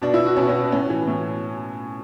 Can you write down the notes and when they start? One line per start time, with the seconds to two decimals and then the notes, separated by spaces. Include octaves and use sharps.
0.02 B2 D4
0.14 E4
0.26 F#4
0.36 B2 C#4
0.49 C#4
0.72 A2 C#4
0.90 E3
1.07 A2